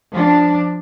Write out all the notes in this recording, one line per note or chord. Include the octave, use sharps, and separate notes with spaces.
F3 D4